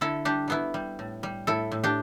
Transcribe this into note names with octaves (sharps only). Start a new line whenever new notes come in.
D3 E4 A4
G3 D4 G4
G3 B3 E4
G3
A2
G3
A2 E4 A4
A2
D4 G4